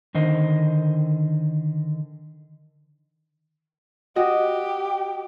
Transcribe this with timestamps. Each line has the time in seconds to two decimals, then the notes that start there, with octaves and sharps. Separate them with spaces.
0.15 D3 D#3 C5 D#5
4.16 F#4 G4 D#5